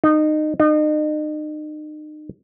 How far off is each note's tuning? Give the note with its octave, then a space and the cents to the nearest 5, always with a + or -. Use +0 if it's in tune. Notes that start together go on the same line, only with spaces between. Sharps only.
D#4 -20
D#4 -35